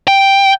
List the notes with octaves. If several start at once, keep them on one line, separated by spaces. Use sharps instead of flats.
G5